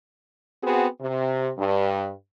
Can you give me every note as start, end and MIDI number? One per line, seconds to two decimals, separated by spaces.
0.63 0.87 59
0.63 0.87 60
0.63 0.87 66
0.63 0.87 68
1.00 1.50 48
1.58 2.10 43